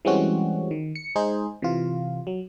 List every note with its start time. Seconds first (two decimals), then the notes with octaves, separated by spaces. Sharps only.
0.05 E3 G3 G#3 C4 C#4 F#4
0.71 D#3
0.95 C#7
1.16 G#3 D#4 G#4 C5
1.62 C3 E3 F4
2.27 F#3